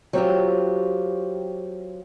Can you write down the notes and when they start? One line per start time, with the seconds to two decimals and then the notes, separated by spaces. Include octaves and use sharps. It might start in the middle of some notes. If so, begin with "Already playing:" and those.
0.13 F#3 C4 F4 G4